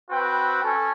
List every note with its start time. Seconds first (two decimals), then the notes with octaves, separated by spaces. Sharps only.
0.11 C4 F#4 B4 G5
0.63 C#4 A4